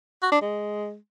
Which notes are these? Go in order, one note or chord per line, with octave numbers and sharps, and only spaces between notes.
F#4
D4
G#3